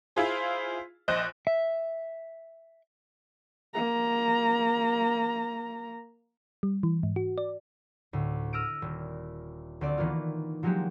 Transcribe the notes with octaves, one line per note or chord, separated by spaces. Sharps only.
E4 F4 G#4 C5
A#1 C5 D#5 F#6
E5
A#3 A#5
G3
E3
G#2
F#4
D5
D2 A2
E6 F6 A#6 D7 D#7
D#1
D2 C4 D5
D#3 E3 A#3 B3 F4
F3 F#3 G#3 A#3 F#4 G4